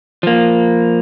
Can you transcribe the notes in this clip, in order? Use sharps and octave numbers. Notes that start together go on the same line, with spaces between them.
F3 A#3